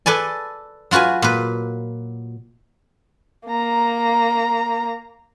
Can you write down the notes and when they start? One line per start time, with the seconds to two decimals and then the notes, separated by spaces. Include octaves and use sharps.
0.06 A4 B4 D5 G#5
0.91 F#3 F4 F#4 B4 G#5
1.22 A#2 B4
3.47 A#3 A#5